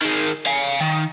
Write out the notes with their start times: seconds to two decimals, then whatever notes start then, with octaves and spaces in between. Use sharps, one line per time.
0.01 D#3 G#3
0.47 F5 G#5
0.80 D#3